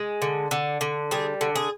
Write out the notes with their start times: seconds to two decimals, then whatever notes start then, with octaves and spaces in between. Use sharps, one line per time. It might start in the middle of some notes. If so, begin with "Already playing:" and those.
Already playing: G#3
0.22 D3
0.51 D3
0.81 D3
1.11 G3 G#4
1.41 D3
1.55 G#4